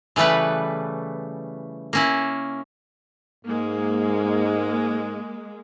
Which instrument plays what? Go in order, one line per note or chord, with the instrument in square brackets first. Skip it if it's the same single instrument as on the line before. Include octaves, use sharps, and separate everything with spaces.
[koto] C#3 E3 G3 A3 B4
A#3 C#4 E4
[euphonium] G#2 [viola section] G#3 A#3